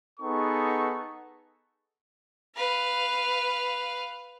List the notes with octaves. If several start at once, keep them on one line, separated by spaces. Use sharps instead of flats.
B3 D#4 G#4 A4 C#6
B4 F5